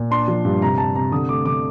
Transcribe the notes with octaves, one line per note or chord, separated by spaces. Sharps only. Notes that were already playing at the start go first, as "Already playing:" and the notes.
Already playing: A#2
D4 C6
F3
G2
C3 A#5
G3 A5
C3 A#5
D3 D#6
A3 D6
D3 D6